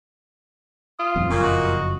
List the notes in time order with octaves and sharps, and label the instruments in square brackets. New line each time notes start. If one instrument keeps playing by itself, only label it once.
[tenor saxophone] F4 [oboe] D#6
[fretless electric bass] D#1 F2
[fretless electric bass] F#1 F2 [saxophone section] A#2 [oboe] C#4
[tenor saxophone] F#4 [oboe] D#5